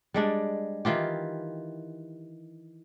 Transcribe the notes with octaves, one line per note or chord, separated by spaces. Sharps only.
G3 G#3 D4
D#3 E3 F4 G4